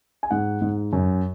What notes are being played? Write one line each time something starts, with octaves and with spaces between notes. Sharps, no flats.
G#5
G#2 F#5
G#2
F#2